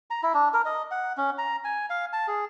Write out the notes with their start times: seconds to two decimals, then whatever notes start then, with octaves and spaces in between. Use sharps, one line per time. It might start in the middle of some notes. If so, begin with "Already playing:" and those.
0.10 A#5
0.23 E4
0.34 D4
0.54 A#4
0.65 D#5
0.91 F#5
1.17 C#4
1.38 A#5
1.64 G#5
1.90 F5
2.13 A5
2.28 G#4